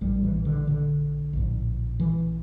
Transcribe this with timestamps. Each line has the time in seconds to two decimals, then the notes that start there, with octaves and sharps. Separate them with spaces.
0.01 A#1 A2 G3
0.24 E3
0.45 D3
0.67 D3
1.33 A#1 A2
2.00 E3